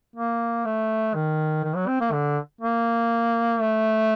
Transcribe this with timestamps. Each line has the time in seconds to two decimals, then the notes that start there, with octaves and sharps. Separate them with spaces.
0.16 A#3
0.65 A3
1.15 D#3
1.64 D#3
1.76 F#3
1.87 C4
2.01 A#3
2.12 D3
2.61 A#3
3.61 A3